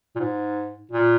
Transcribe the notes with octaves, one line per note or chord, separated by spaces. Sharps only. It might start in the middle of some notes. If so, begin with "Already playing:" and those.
A#2
G#2
A#2